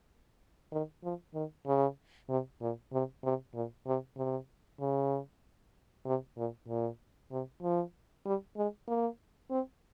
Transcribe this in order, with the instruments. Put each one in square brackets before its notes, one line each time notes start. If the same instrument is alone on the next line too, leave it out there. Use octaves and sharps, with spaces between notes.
[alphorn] D#3
F3
D#3
C#3
C3
A#2
C3
C3
A#2
C3
C3
C#3
C3
A#2
A#2
C3
F3
G3
G#3
A#3
C4